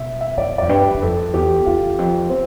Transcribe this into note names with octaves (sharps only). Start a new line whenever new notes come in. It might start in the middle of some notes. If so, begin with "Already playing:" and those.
Already playing: B2 E5
E5
G2 D5
D5
F2
G2
B4
G2
F2 A4
E2 G4
E2 F4
F2
C4